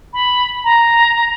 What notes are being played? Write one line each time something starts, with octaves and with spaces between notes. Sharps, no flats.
B5
A#5